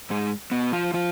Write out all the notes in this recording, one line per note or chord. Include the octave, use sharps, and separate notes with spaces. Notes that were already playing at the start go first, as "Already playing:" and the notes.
G#2 G#3
B2 B3
F3 F4
F3 F4